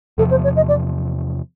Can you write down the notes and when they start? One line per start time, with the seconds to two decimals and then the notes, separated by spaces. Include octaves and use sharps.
0.18 E2 C3 F3 A4
0.31 C5
0.44 C#5
0.56 D#5
0.68 D5